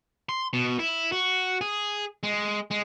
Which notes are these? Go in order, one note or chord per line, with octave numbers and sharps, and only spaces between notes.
C6
B2
E4
F#4
G#4
G#3
G#3